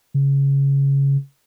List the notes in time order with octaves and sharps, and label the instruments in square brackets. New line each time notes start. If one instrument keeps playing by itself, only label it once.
[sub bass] C#3